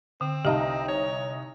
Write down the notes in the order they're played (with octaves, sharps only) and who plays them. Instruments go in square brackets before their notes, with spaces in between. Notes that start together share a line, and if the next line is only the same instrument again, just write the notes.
[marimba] D3 [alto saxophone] C4
[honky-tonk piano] C2 D#4 D#5 [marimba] G4 F5 A5
[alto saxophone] C#5